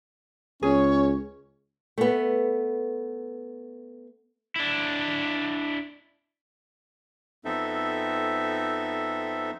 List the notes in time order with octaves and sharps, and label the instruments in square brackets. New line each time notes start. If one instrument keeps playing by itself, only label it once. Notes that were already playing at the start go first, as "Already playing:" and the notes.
[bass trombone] C#2 [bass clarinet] C#4 [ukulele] G#4 [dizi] C#5
[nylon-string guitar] A3 B3
[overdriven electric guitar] D4 E4
[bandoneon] F2 B3 C4 D#4 A4 E5